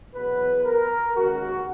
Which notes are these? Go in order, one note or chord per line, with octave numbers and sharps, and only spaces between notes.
E2 B2 F#3 B3 B4
A#4
D#2 C#3 G#3 F#4